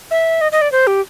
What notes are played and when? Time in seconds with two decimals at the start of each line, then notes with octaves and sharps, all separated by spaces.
0.11 E5
0.41 D#5
0.52 D#5
0.61 D5
0.72 C5
0.87 G4